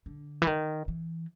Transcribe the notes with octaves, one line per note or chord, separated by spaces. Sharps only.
D3
E3
D#3
E3